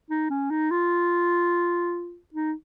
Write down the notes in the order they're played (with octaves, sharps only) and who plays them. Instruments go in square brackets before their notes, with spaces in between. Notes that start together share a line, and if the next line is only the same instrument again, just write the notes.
[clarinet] D#4
C#4
D#4
F4
D#4